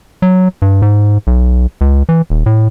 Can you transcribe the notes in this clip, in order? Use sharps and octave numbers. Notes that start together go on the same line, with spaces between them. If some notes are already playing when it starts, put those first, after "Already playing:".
F#3
G2
G#2
B1
C#2
E3
D#1
A2